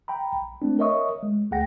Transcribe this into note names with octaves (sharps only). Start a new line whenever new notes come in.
G5 A#5 B5
A#1
A3 C4 D4
A#4 C#5 D#5 E5 C#6 D#6
G#3
D2 A3 G#4 F#5 G5 A#6